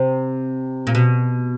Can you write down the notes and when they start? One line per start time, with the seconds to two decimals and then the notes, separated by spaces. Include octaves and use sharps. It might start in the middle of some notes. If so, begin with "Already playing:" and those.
Already playing: C3
0.87 A#2
0.95 B2